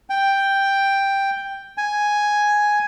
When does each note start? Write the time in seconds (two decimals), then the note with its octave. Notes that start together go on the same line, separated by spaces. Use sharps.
0.10 G5
1.78 G#5